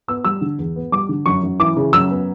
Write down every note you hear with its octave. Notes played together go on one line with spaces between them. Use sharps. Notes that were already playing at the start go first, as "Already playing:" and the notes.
B3 E6
G3 E6
D3
E2
B3
G3 D6
D3
F#2 C#6
F#2
E3 D6
C#3
F#2 E6
B3